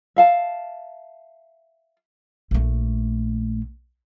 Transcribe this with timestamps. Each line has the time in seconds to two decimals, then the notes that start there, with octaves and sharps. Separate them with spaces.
0.16 E5 F5 A5
2.51 A#1 A3